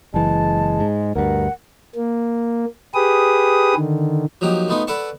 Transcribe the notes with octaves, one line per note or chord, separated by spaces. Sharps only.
F#1 E3 G#3 A5
G#2
D2 G2 A#4 F#5
A#3
G4 G#4 B4 D#6
D3 D#3
F3 F#3 A#3 D#4 G4
A3 B3 D#4 F4 A4
A4 B4 D5 F#5 A5 C#6